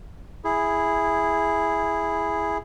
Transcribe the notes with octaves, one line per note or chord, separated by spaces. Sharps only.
E4 G#4